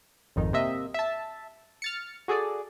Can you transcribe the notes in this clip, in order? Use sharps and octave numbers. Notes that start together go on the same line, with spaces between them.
G#1 F2 D#3 D#4
C3 A#3 D#5 E5
E5 A5
F6 A6 C#7
F#4 G#4 A4 D5